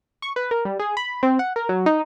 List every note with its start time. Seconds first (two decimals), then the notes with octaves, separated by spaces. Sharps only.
0.22 C#6
0.36 B4
0.51 A#4
0.65 G3
0.79 G#4
0.97 B5
1.23 C4
1.39 F#5
1.56 A#4
1.69 F#3
1.86 D#4